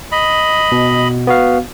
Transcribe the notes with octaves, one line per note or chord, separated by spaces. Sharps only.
D#5 B5
B2
B3 F#4 F5